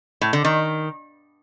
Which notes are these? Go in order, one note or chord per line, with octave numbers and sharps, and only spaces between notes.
A2
D3
D#3